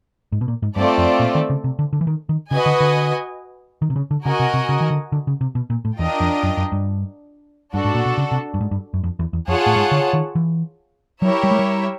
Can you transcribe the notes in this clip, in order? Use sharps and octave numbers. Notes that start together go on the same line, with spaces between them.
G#2
B2
A#2
G#2
G2 A3 C4 F4 A4 D5
F2
A#2
D#3
C#3
C3
D3
D3
E3
D#3
D#3
C#3 F#4 B4 D#5 G#5
D3
D3
D#3
C3
C#3
D3
C#3 F#4 A#4 D#5 G#5
C3
C3
C#3
D#3
D3
D3
C#3
C3
B2
A#2
A2
E2 D4 F4 A#4 D#5 G5
F2
F#2
F#2
G2
G2 D4 F#4 A4
G#2
A#2
B2
C#3
C3
G2
G#2
G2
F#2
F2
E2
E2
F2 F4 G#4 C#5 F#5 A5
A2
G#2
D3
D#3
E3
F#3 E4 G4 A#4 C#5 E5
G3
G#3
G3